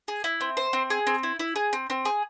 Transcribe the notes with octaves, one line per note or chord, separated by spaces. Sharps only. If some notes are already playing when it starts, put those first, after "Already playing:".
G#4
E4
C4
C5
C4
G#4
C4
E4
E4
G#4
C4
C4
G#4